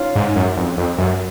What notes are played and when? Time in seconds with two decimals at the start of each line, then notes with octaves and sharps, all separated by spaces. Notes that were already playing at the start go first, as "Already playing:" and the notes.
Already playing: C#4 D#4 F4
0.15 G#2
0.36 F#2
0.57 F2
0.78 F2
0.98 F#2